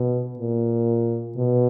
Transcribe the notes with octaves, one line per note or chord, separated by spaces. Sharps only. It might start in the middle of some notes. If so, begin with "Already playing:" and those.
Already playing: B2
A#2
B2